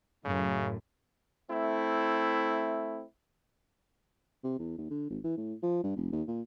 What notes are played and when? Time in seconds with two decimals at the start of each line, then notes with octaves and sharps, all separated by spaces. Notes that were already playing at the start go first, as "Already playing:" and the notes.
0.25 F#2 A2 C#3
1.50 A3 C4 E4
4.44 C3
4.59 E2
4.78 D#2
4.91 D3
5.10 G#1
5.24 E3
5.37 A2
5.63 F3
5.84 G2
5.97 F1
6.12 D#2
6.28 A#2